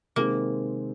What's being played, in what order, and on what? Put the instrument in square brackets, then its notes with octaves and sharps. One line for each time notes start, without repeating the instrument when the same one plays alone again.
[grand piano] C3 D#3 G#3 C4 [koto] A#3